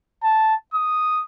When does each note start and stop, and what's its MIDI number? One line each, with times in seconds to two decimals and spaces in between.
0.23 0.54 81
0.74 1.22 87